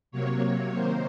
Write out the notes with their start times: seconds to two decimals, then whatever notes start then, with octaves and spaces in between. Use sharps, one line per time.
0.11 C3 F#3 A#3 C#5
0.74 C3 D#3 A#3 C5